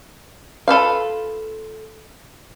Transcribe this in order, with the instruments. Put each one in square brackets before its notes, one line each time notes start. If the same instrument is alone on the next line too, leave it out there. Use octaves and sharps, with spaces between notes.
[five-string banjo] F4 A4 B4 F5